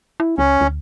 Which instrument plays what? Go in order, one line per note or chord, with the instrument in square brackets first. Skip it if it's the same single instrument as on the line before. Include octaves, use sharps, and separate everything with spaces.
[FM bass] E4
[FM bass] C#2 [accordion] C#4
[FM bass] D2